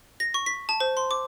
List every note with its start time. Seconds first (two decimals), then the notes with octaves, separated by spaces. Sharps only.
0.20 A#6
0.34 C#6
0.46 B6
0.69 A5
0.80 C5
0.97 C6
1.11 D6